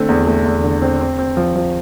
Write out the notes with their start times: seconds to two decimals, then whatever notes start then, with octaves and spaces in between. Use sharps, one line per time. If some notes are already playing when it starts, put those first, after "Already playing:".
Already playing: D3 A3 C4
0.09 E2
0.27 A3
0.45 E2
0.64 D3
0.82 C4
1.00 C4
1.19 C4
1.37 F3
1.55 F3